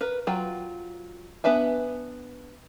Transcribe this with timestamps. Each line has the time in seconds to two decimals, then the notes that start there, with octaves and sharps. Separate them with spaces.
0.01 A#4 B4
0.27 F#3 F4 G5
1.44 B3 D4 B4 E5 G#5